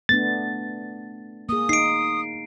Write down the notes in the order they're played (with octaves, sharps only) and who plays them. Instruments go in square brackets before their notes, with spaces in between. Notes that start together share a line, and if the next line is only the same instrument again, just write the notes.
[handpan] A3 B3 D4 [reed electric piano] A6
[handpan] A#3 G#4 [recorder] D#6
[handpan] D#4 [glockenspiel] C7 D7